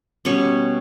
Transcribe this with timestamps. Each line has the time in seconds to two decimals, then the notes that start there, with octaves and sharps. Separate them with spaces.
0.25 B2 G3 B3 C#4 C#5